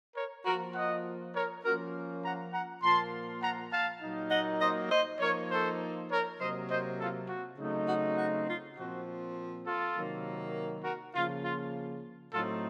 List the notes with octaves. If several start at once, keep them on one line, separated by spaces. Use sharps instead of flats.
A#4 C#5
F3 A#3 F4 F#4 A#4
D#5 F#5
A#4 C#5
F3 A#3 C#4 F4 F#4 A#4
F#5 A#5
F#5 A#5
A#2 F3 A#3 F4 A5 C6
F#5 A#5
F5 A5
A#2 F#3 A#3 D#4
D#5 F#5
C5 D#5
C5 D#5
F3 A#3 D#4 A#4 C#5
A4 C5
A#4 C#5
C3 F#3 A#3 C5 D#5
C5 D#5
F4 A4
F#4
C#3 F#3 A3 C4 D#4
F#4
F#4
F4
A#2 F3 C4 F#4
F4 A4
C3 D#3 F#3 A#3
F#4 A#4
C#3 F3 A#3 F4
F4
A2 F#3 A3 C4 D#4 F4 A4